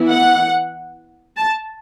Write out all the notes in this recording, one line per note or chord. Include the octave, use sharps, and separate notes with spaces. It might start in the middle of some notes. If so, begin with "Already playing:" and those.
Already playing: E3 B3 E4
F#5
A5